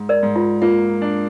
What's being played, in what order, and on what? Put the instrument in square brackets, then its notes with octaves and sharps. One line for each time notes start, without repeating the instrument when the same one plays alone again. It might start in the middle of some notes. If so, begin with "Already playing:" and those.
Already playing: [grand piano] G#2
[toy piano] A#4 D5
[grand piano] G#2
[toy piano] F4
[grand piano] A#3 [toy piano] F4
[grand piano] D4